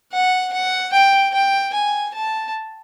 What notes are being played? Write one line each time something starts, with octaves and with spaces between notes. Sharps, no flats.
F#5
F#5
G5
G5
G#5
A5